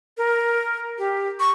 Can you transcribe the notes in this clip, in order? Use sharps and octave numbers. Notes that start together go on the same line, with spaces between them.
A#4
G4
C#6